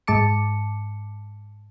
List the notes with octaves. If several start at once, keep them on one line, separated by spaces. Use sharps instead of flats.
G#2 G#3 A5 D6 C#7